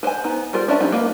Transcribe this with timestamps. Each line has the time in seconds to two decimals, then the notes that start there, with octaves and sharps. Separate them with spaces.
0.03 B4 C5 D#5 G#5
0.24 B3 D#4
0.53 G3 F4 G#4 A#4 C5
0.68 C#4 D4 A#4 E5 A5
0.80 F#3 B3 C#4 D#4 G4
0.92 A#3 B4 F5